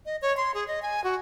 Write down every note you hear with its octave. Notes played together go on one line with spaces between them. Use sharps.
D#5
C#5
C6
G#4
D#5
G#5
F#4